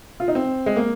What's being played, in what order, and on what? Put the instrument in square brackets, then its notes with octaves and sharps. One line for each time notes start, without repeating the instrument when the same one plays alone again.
[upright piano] F4
D#4
C4
G#3
A#3